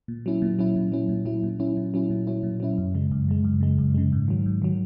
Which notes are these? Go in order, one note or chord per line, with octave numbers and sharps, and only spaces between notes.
A#2
F#3 C#4 E4
A#2
F#3 C#4 E4
A#2
F#3 C#4 E4
A#2
F#3 C#4 E4
A#2
F#3 C#4 E4
A#2
F#3 C#4 E4
A#2
F#3 C#4 E4
A#2
F#3 C#4 E4
F#2
C#3 G#3
F#2
C#3 G#3
F#2
C#3 G#3
F#2
C#3 G#3
G#2
D#3 F#3
G#2
D#3 F#3